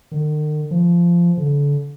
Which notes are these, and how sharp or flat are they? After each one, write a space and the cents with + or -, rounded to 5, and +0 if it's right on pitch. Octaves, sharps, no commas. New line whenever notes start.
D#3 -45
F3 -15
D3 -35